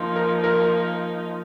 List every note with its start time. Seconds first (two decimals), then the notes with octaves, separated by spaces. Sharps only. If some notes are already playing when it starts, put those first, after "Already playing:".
Already playing: F3 A#3 D#4
0.16 A#4
0.44 A#4